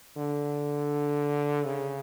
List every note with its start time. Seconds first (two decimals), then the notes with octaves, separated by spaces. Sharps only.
0.17 D3
1.65 C#3